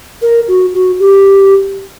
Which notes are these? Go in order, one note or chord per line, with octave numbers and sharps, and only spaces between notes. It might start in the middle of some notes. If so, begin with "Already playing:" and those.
A#4
F#4
F#4
G4